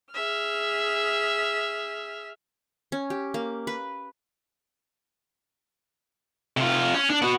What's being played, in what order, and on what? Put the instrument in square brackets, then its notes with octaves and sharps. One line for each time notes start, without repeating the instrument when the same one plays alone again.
[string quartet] G#4 E5 F6
[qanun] C#4
G4
A#3
B4
[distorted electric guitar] C3 F4
C#4
D4
B3 F#4